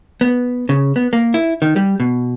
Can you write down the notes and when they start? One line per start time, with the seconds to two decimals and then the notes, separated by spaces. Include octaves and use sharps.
0.21 B3
0.69 C#3
0.96 B3
1.13 A#3
1.34 E4
1.62 D#3
1.76 G3
2.00 B2